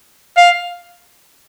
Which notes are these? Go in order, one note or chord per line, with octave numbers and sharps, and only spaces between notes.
F5